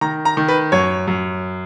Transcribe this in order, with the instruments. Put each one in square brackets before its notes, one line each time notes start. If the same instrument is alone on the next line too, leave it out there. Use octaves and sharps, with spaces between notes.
[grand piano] D#3 A#5
A#5
D#3
B4
F#2 C#5
F#2